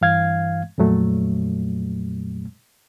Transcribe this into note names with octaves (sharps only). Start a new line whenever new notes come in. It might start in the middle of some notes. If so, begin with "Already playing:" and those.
G2 E3 F5 G#6
F2 A#2 F#3 A3